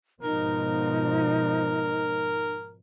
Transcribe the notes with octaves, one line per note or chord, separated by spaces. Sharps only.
G#2 B2 F3 D#4 A#4